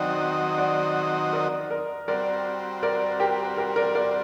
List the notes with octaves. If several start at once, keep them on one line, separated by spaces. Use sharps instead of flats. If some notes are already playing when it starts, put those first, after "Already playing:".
Already playing: D#3 F#3 C4 D#4 F#4 D5 F#5 G5
D5 F#5
A#4 D5
A#4 D5
G3 C4 F#4 A#4 D5
A#4 D5
G4 A#4
G4 A#4
A#4 D5
A#4 D5